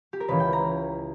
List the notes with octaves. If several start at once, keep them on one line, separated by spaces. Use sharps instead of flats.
G4
A#4
C#2 C#3 E3 B4
G5
A#5